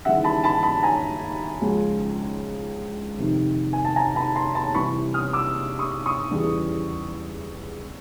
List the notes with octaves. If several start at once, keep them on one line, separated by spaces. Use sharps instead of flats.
D#2 C#3 E3 G3 E5 F#5
A5 B5
A5 B5
A5 B5
G#5 A#5
C#2 C#3 F3
F2 C3 D#3
G#5
A5
G#5 A#5
A5 B5
A#5 C6
A5 B5
C2 C3 E3 B5 C#6
D#6 F6
D6 E6
C#6 D#6
C#6 D#6
E2 C#3 E3 G3